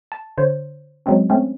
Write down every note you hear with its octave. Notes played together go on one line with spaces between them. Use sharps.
A5
D3 C5 C#5
F#3 G#3 C4 C#4
A3 C4 C#4